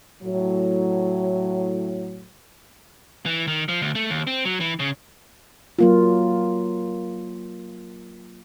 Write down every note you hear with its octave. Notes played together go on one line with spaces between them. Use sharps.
A2 F#3
E3
D#3
F3
D2
A3
D#2
C4
F#3
E3
C#3
F#3 A#3 F4